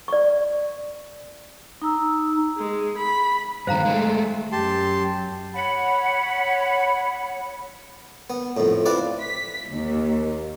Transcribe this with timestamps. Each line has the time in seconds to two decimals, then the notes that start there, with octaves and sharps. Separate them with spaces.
0.08 D5 C#6
1.82 D#4 A#5 E6
2.57 G#3
2.98 B5
3.67 G2 D#3 C5 F5 A#5
3.85 G#3 A3
4.52 F#2 G4 A5 C6
5.54 C#5 F#5 B5
8.30 B3
8.57 F2 A2
8.86 C4 E4 F4 B4 D5
9.21 B6
9.70 D#2